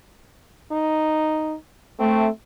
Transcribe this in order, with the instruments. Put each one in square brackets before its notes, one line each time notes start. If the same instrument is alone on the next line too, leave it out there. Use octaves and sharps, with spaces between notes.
[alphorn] D#4
[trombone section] A3 [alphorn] C4